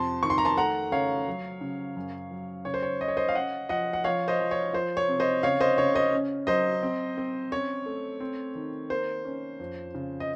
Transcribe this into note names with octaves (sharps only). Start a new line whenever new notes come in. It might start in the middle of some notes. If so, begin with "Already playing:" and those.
Already playing: F2 C3 A5 C6
D#3 C#6
C6
A#5
A5 C6
A3 F#5 A#5
C#3 C#5 F5
F#3
C#3
F#2
F#3
C#3 C#5
C5
C#5
C#4 D#5
C#5
C5 D#5
F5
C#4 D#5 F#5
F3 D#5 F#5
F#5
F3 C#5 F5
C5 D#5
F3
C#5
F3 C5
C#5
C3
C5 D#5
C#3 C#5 F5
C5 D#5
C#3 C#5
C5 D#5
C#4
F#3 C5 D#5
C4
C4
C#4 C#5
A3
C4
D#3
A#3 C5
C#4
F2
C#3
D#5